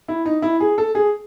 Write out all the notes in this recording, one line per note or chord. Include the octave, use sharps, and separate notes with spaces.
E4
D#4
E4
G#4
A4
G#4